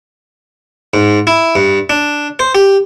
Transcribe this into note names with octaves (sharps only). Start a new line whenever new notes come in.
G#2
E4
G2
D4
C5
G4